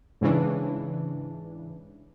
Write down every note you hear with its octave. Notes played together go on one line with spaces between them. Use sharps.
G#2 C#3 E3 D4